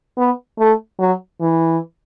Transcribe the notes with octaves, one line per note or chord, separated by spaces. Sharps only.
B3
A3
F#3
E3